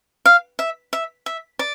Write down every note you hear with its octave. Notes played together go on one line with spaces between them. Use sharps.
F5
E5
E5
E5
D5